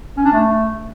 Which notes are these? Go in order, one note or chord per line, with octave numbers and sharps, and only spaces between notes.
C#4
D4
A3